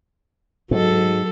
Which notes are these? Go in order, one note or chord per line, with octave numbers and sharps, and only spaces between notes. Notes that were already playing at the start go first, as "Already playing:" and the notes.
G#2 F#3 A4